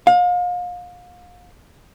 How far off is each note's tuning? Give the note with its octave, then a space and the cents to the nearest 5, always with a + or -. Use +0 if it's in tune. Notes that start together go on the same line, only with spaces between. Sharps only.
F5 +35